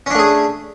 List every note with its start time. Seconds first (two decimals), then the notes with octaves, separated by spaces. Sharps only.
0.06 C#4
0.10 D4
0.15 A3
0.19 G#4